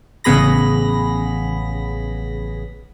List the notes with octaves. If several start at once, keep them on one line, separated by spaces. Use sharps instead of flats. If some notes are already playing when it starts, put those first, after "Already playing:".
A1 C#3 B3 G#4 B5 A#6